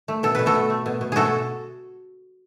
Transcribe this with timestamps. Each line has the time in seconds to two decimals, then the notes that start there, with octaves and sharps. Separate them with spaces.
0.08 A3
0.23 B2 A4
0.35 B2 B4
0.46 F#4 A4
0.55 A3
0.70 A3
0.86 B2
1.01 B2
1.12 A3 F#4 G#4 A4